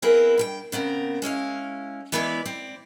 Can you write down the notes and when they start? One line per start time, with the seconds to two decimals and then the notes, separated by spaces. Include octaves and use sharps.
0.02 B3 C4 E4 G#4 A#4 B4
0.38 G2 A4 G5
0.72 C#3 B3 C4 A#4
1.22 G#3 C#4 E4 F5
2.12 E3 G#3 B3 E4 B4 D5
2.46 C4 D5